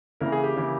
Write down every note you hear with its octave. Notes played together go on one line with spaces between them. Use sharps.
C#3 E3 A#3 E4 A#4
G#4
G4
C#3 E3 A#3 E4